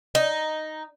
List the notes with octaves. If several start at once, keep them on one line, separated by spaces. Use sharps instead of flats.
D#4